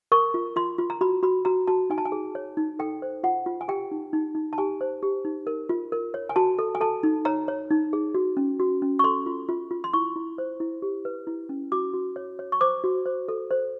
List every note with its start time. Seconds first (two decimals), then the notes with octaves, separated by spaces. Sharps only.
0.12 A#4 C#6
0.34 F4
0.56 F4 C6
0.78 F4
0.90 A#5
1.01 F#4 B5
1.23 F#4 B5
1.45 F#4 A#5
1.67 F#4 A5
1.90 D#4 G#5
1.98 A5
2.05 G#5
2.12 G#4
2.35 C#5
2.57 D#4
2.79 A4 G5
3.02 C5
3.24 F4 F#5
3.46 F4
3.61 G#5
3.68 G4 G5
3.91 D#4
4.13 D#4
4.35 D#4
4.53 A5
4.58 G4 G#5
4.81 C5
5.03 G4
5.25 D#4
5.47 A#4
5.69 F4
5.92 A#4
6.14 C#5
6.29 G#5
6.36 F#4 A5
6.59 A4
6.75 G#5
6.81 A4 A5
7.03 D#4
7.25 C#5 A#5
7.48 C#5
7.71 D#4
7.93 G#4
8.14 F#4
8.37 C#4
8.60 F#4
8.82 C#4
8.99 C#6
9.04 A4 C6
9.26 F4
9.49 F4
9.71 F4
9.84 C6
9.93 E4 C#6
10.16 E4
10.38 C5
10.60 E4
10.82 G4
11.05 B4
11.27 E4
11.49 C#4
11.72 F#4 D6
11.94 F#4
12.16 C#5
12.39 C#5
12.52 C#6
12.61 C5 D6
12.84 F#4
13.06 C5
13.28 A4
13.51 C5